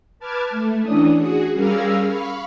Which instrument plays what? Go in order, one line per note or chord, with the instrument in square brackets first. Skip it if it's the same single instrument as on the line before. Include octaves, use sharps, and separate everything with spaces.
[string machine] B4 A5 D6 F6 G#6
A3
E3 C#4 D4 D#6
F#4 G#4
G3 C#4 G#4 A#4 F5 E6
F5 B5 C#6